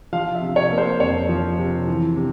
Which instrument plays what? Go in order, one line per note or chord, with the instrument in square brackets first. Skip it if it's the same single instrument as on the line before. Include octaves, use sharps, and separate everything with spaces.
[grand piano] F3 F5
E5
C3
C#5
A#3
C5
F2 C#5
F3
C3
E3
C3